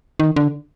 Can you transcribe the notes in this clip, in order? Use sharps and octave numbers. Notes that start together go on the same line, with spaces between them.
D#3
D3